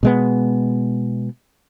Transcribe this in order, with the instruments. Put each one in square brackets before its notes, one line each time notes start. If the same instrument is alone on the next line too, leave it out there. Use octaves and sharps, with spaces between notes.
[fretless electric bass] B2 G#3 B3